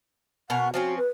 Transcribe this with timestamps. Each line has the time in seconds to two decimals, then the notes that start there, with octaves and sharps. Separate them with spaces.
0.50 B2 C#4 A#4 F#5
0.74 F3 C4 C#4 F#4
0.98 B4